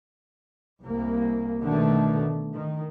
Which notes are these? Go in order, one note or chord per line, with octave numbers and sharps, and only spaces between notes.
C2 A#3
B2 D3 D#3 A3
D#3